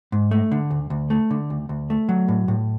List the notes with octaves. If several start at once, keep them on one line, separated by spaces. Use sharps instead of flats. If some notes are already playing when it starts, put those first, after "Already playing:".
G#2
A3
D3
D2
D2
A3
D3
D2
D2
A3
F#3
A2
A2